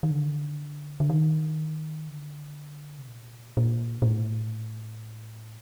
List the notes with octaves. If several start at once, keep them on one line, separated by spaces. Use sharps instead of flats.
D#3
D3
D3
D#3
D3
C3
A#2
A#2
A#2
A2